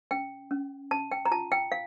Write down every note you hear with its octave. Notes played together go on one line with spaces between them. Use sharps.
C#4 G5
C#4
C#4 A5
G5
A#5
F4 A5
G5
F5